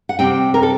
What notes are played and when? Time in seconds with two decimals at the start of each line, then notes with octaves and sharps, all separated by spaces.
0.09 F#5
0.19 C3 G3 C4 G5
0.54 A#4
0.63 A4